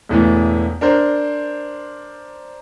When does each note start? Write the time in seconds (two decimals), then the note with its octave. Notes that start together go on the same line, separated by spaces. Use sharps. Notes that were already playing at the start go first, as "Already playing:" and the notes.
0.09 E1 A2 E3 B3
0.81 D4 A#4 C5